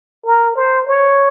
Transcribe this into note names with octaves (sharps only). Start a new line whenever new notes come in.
A#4
C5
C#5